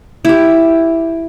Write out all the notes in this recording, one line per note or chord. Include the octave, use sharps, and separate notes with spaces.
E4 G4